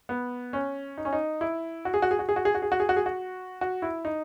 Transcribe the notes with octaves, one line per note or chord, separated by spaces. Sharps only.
B3
C#4
D#4
C#4
D#4
E4
F#4
G#4
F#4
G#4
F#4
G#4
F#4
G#4
F#4
G#4
F#4
G#4
F#4
G#4
F#4
F#4
E4
D#4